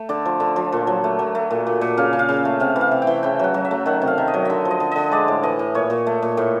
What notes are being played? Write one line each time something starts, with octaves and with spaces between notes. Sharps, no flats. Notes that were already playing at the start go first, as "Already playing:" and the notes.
Already playing: A3
D3 D5
F3
D3
F3
A#2
F#3
A3
F#3
A3
A#2
A#2
A#2
C#3 F5
C#3
F5
C#3
A3
C3 F5
E3
F5
C3
G5
E3
C#3 G5
F#3 F#5
F#3
E5
A3
D#3 F#5
C3
F5
D#3
D#5
F#3
D3 D#5 E5
F3
D#5
D3
D3 D#5
G#3 D5
A2
E3 D#5
A2
A#2 C#5
A#2
A3
A#2
A2